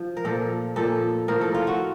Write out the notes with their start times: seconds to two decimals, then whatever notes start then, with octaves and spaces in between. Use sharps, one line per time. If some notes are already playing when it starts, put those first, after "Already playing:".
Already playing: F3
0.17 A#4
0.25 A#2 F3 A4
0.76 A#2 F3 A4
1.28 A2 F3 A#4
1.41 A4
1.55 F4
1.67 F#4